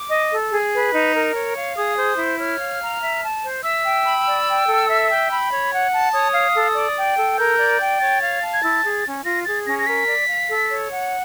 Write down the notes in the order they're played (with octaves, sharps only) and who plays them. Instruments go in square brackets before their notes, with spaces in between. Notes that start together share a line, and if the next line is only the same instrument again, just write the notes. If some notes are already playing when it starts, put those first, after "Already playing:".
Already playing: [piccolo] D6
[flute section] D#5
A4
G#4
B4
D#4
A#4
C#5
F5
[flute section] G#4 [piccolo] D#6
[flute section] C5
E4
[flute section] C#5 [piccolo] F6
[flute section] F5
A#5
E5
A5
C5
[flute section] E5 [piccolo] E6
[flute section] G5
B5
D5
G5
A4
E5
G5
B5
C#5
F#5
A5
[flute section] C#5 [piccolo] D#6
[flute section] F5
A4
D5
G5
A4
[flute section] A#4 [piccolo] G6
[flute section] D5
G5
[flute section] C#5 [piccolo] A6
[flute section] F5
A5
[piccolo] G#6
[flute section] E4 [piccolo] A6
[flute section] G#4
C#4
[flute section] F4 [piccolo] A#6
[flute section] G#4 [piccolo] A6
[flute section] C#4 [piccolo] A#6
[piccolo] A#6
[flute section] A#4 [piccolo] B6
[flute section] D5
F5
A4
C#5
F#5